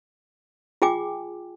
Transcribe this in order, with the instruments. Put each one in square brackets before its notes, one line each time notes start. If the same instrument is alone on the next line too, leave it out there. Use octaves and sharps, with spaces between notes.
[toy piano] F4 G#4 G5 G#5 D6